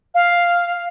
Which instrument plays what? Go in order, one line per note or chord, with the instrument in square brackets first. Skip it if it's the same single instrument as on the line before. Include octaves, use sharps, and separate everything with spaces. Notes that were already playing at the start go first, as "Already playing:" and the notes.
[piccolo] F5